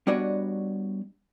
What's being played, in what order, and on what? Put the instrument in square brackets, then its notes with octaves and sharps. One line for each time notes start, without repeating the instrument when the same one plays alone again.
[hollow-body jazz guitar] G3 B3 D4 F#4 C#5 D#5